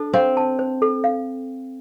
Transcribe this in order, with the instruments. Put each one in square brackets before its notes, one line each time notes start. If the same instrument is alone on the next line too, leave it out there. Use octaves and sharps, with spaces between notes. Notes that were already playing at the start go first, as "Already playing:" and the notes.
Already playing: [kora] D4 [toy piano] A4
[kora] C4 [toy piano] F5
[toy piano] A5
C5
A4
F5